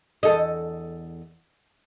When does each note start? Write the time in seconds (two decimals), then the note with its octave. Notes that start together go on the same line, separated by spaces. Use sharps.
0.23 E2 A4 D#5